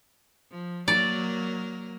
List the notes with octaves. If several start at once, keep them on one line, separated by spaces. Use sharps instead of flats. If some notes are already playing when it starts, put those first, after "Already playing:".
F3
F#3 A#3 A#4 D5